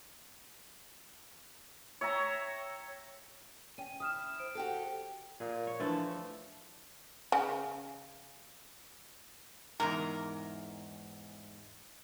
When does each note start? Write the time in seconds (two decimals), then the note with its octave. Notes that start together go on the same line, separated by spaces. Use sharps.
2.01 C#5 E5 G5 A#5
3.78 C#4 G5 D#7
4.00 E4 D#6 F6 E7
4.39 C5 D7
4.55 F#4 G4 A4
5.40 A#2 G#4
5.67 C#5
5.80 D3 E3 F3 A3
7.32 C#3
9.80 E2 G#2 A#4